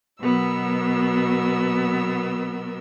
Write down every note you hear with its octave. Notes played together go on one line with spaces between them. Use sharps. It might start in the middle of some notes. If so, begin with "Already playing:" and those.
B2 F#3 B3 A#4 E6